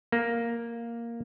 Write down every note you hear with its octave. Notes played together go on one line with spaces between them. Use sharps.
A#3